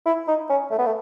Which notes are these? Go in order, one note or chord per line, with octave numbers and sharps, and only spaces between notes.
E4
D#4
C#4
A3
B3
A3